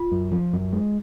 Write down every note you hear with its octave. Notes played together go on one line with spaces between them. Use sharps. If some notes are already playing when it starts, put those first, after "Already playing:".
Already playing: F4
F#2
F3
F#2
G#3